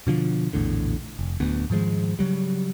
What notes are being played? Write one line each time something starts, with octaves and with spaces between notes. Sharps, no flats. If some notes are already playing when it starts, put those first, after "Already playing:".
B2 D3 F3
A#1 E2 A2 D3
F1
D1 D2 B3
G#2 D#3 F3 G#3
C#3 F#3 G3